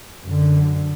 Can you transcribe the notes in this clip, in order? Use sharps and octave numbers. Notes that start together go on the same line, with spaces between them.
F#2 D3